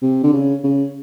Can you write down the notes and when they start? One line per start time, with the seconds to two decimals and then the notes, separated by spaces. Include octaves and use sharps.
0.02 C3
0.23 D3
0.33 C#3
0.63 C#3